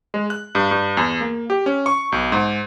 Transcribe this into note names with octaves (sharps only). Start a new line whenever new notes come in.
G#3
F#6
G2
G2
E2
A#3
G4
C#4
C#6
B1
G#2